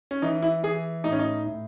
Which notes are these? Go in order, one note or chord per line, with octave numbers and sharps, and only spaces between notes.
C#4
E3 D#4
E4
E3 G#4
A2 D#4
C#4
D#4
A2